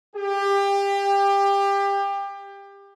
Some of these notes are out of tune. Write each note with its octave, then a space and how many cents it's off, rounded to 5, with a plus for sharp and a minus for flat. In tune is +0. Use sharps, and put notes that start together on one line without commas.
G4 +25